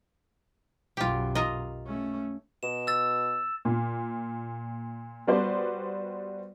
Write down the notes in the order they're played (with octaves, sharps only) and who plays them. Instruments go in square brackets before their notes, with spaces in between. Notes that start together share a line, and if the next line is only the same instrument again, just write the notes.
[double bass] B1 F#2 [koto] F4 G4
[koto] F4 A#4 D#5
[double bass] A3 C#4
[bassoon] B2 [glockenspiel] E7
[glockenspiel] E6 A6
[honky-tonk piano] A#2
G3 B3 F#4 B4 C5 D5